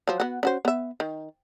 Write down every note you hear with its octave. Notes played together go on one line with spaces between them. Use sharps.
F3 F#3
B3 F#4
C#4 F#4 C5
B3 E5
D#3